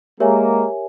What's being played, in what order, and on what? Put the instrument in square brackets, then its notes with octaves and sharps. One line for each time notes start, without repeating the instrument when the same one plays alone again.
[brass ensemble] G#3 A#3 [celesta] G4 A#4 C#5 E5 G#5